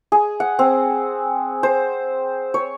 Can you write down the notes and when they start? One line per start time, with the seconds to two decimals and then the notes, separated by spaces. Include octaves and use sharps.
0.12 G#4
0.40 F#5
0.59 C4
1.63 C5
2.54 C#5